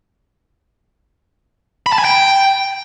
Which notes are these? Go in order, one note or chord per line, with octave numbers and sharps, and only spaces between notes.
B5
A5
G#5
G5